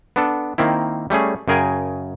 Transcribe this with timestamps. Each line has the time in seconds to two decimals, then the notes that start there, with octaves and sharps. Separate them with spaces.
0.16 B3 D4 A4
0.58 D#3 A#3 C4 E4
1.10 G3 A3 C#4 G#4
1.48 F#2 C#3 G#4 A#4 G5 G#5